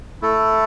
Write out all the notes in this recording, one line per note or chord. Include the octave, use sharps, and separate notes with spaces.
A3 E4 A4